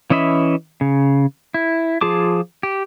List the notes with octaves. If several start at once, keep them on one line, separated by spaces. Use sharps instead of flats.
E3 C#4 D#5 E5 B5
C#3
E4
F3 F4 G#4 A5 D6
G4